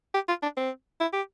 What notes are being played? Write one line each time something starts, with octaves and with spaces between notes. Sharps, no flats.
G4
F4
D4
C4
E4
G4